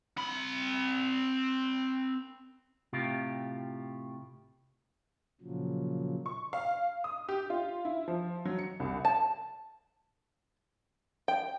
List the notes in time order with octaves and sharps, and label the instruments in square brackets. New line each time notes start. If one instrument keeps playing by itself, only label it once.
[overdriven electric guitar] C4 B5
[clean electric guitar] A2 C3 F4 G4
[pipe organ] A#2 C#3 F3 F#3
[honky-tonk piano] C#6
F5
D#6
G4
F4
E4
F3
F#3
C#7
C2
[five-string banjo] A5
G5